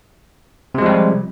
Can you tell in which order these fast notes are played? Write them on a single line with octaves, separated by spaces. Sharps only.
C3 G#3 F3 G3